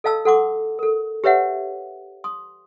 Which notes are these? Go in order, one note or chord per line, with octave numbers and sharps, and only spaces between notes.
A4 D#5 F5 A5 E6
A4 F#5 C6 D6
A4 A#4
G4 B4 C#5 E5 F#5
C6 D#6